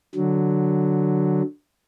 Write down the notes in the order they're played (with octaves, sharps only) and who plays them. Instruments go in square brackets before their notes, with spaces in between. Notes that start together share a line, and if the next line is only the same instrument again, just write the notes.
[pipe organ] D3 F#3